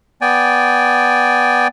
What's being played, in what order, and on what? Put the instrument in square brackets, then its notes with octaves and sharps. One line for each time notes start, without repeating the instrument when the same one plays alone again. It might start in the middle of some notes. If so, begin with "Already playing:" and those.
[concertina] B3 D5 G5 G#5